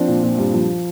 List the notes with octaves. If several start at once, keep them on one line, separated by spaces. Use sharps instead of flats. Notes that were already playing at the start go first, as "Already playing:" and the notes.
Already playing: F3 C4 D4
A#2
A#2
G2
F3